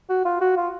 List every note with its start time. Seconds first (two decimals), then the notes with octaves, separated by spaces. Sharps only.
0.09 F#4
0.25 F4
0.41 F#4
0.57 F4